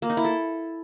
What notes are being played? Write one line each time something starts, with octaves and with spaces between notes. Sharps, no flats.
A#3
D#4
E4
A4